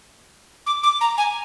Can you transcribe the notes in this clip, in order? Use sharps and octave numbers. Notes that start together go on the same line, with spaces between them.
D6
D6
A#5
G#5